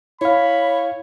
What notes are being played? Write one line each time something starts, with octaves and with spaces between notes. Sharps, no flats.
E4 C#5 F5 B5